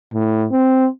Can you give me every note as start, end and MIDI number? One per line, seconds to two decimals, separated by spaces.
0.14 0.46 45
0.51 0.86 60